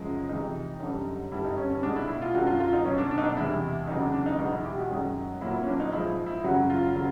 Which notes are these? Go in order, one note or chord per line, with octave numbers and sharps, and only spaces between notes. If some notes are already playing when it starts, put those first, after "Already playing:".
Already playing: F#2 C#3 F3 G#3
F2 C3 E3 G#3 D#4
F#2 D3 G3
G2 D3 G3 E4
D#4
C#4
C#4
B2 G#3 D4
E4
E4
F4
F#2 D3 F#3 F#4
F4
F4
D#4
B2 F#3 C#4
D4
D4
D#4
D4
E2 C3 E3 G#3 E4
E2 C#3 F#3 D#4
D4
D4
D#4
E2 B2 G#3 D#4
E4
G4
F#4
F#2 D#3 G#3
A#2 F#3 E4
E4
C#4
D4
D#4
G#2 F3 G#3 E4
E4
F#2 C#3 F#3 F#4
F4
C#3 F#3